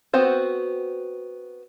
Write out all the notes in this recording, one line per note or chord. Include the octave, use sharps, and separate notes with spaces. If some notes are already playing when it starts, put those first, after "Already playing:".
B3 C4 F#4 C5